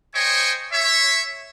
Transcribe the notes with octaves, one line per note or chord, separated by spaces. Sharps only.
C5 C#5 D#5 G5 G#5 C#6
C#5 E5